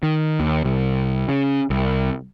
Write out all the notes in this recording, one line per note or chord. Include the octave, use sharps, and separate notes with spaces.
D#3
D#2
C2
C#3
C2